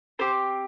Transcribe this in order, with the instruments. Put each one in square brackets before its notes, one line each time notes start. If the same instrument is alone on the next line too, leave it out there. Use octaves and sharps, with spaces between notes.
[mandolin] C4 G4 C5